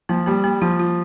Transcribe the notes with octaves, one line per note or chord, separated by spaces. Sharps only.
F3 A#3
G3 A#3
G3 A#3
F3 F4
F4